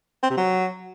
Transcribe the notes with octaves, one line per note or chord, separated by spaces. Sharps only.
C4
C3
F#3